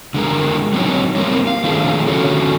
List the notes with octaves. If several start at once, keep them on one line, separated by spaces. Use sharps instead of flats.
D3 G#3 A#4
F#3 C4 D4 D#4 C#5
G3 A#3 C4 A#4
F5
D#3 F3 A3 C4 D4 G#4
D3 C#4 F#4 A4 C#5